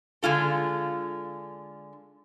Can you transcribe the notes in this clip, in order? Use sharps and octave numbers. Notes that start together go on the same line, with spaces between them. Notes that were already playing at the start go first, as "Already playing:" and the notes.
D3 G#3 F4 A4